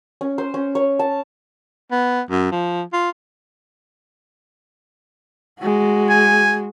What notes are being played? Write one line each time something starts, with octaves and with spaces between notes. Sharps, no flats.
C#4
C5
C#4
C#5
A5
B3
F#2
F3
F4
G#3 F#4
G#5